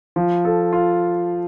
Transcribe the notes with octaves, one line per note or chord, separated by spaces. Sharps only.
F3
A4
F4